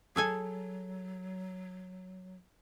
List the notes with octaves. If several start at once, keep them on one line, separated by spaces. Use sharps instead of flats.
F#3 G#4 A4 G#5